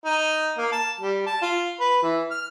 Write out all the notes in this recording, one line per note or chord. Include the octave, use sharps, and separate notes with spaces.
D#4
A#3
A5
G3
A5
F4
B4
E3
F6